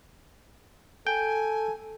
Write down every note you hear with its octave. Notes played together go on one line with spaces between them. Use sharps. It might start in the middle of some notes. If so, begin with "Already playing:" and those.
A4 G5 G#5